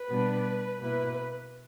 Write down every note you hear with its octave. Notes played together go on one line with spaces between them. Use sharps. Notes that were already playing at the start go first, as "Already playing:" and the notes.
Already playing: B4
B2 G3 B3 D4
B2 A#3 E4 B4